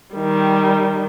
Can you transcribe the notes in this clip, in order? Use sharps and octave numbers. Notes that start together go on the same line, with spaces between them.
D#3 G3